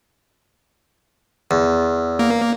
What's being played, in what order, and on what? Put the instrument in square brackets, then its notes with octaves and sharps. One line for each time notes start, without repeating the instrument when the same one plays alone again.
[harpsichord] E2
[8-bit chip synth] A#3